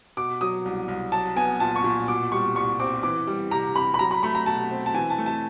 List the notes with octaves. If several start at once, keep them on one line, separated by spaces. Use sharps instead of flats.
B2 D6
F#3 D#6
C2
C2
F#3 A5
B3 G#5
A#2 A5
C#6
A#2
B2 D6
G3 C#6
C2 C#6
C4 D6
E3 D6
G3
C3 A#5
C3 B5
B5
F#3 A#5
B5
A3 B5
A#5
B2 A5
C4
A5
E3 G#5
A5
A3
A5